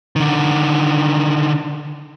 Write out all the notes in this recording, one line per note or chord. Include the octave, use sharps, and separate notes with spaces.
D3 D#3